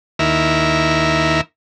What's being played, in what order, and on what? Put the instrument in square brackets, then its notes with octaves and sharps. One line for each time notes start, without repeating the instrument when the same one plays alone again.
[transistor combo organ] D#2 E4 A#4